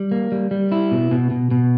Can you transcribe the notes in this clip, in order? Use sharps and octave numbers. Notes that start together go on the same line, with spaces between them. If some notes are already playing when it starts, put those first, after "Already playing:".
Already playing: G3
A#3
G3
G3
E4
B2
B2
B2
B2